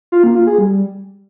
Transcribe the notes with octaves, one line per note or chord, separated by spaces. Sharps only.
F4
A#3
F4
G#4
G3